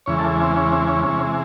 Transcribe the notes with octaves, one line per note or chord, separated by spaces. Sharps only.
E2 C#3 E3 G#3 C#5
A4
C4
C#4
C4
C#4
C3 E3 G#3 C#4